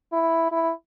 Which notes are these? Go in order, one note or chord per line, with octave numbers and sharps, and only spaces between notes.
E4
E4